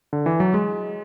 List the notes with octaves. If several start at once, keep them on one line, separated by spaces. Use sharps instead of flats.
D3
E3
F#3
G#3